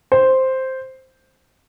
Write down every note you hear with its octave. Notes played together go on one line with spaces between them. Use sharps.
C5